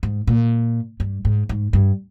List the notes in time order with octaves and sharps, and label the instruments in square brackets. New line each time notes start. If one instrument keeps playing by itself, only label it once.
[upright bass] G#2
A#2
G2
G#2
G#2
G2